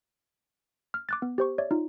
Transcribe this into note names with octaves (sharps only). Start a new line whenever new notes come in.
F6
D6 F#6 A6
B3
G4 C5 C#6
C#5 D5 E5
D#4 F4